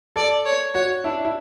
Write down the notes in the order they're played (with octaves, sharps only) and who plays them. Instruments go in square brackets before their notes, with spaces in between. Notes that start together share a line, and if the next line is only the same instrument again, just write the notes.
[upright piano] A4 [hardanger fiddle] D5
[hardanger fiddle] C#5
[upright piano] F#4 [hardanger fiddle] C#5
[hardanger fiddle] D4 [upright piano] E4
[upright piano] E4